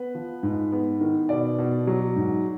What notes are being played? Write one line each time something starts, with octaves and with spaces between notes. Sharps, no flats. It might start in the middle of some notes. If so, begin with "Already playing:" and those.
Already playing: B3 B4
F3
G#2
B3
D#3
B2 D5
B2
F#3
G#2